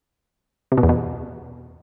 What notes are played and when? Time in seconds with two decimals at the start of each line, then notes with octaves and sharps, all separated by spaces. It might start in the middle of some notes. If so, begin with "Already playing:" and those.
0.72 C3
0.78 B2
0.83 E2
0.89 B2